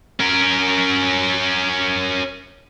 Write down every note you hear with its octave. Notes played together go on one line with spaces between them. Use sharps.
C#4 A#4